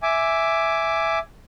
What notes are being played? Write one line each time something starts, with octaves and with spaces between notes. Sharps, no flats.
E5 G#5 D6